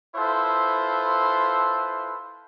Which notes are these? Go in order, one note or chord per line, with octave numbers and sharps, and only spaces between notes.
E4 F4 A4 B4 C5